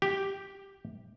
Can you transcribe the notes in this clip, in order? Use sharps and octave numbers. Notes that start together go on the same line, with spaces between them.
G4